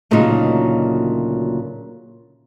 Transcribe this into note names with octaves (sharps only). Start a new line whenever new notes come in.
D2 A#2 C#3 F#3 A#3 D#4